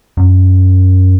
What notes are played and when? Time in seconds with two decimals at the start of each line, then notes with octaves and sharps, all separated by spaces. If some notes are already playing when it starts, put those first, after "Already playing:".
0.17 F#2